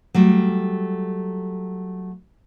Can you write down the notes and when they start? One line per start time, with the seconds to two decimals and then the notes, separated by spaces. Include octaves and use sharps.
0.14 F#3 G3 A3